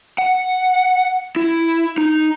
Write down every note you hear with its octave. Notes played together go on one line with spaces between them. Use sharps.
F#5
E4
D#4